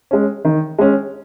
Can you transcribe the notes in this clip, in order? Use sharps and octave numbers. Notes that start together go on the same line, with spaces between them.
G#3 C#4
D#3
G#3 C#4